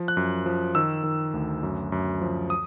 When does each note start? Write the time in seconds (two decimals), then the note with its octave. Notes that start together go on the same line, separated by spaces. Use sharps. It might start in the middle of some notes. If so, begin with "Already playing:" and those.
Already playing: F3
0.08 F#6
0.17 F#2
0.46 F3
0.75 D#3 E6
1.04 D#3
1.34 D2
1.63 F#2
1.92 F#2
2.21 F3
2.50 D#6